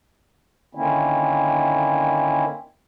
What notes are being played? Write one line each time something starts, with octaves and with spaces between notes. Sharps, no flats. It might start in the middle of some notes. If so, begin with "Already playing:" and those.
D3 D#3 A#3 C4 C#4 E4